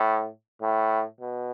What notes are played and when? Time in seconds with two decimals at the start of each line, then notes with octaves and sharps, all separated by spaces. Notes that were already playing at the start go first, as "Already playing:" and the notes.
Already playing: A2
0.62 A2
1.21 B2